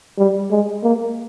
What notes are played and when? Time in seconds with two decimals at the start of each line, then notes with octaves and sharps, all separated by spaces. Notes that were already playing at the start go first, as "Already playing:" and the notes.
0.18 G3
0.51 G#3
0.83 A#3